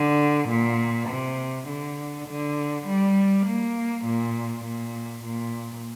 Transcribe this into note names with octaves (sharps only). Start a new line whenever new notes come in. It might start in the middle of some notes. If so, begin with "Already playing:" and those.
Already playing: D3
A#2
C3
D3
D3
G3
A#3
A#2
A#2
A#2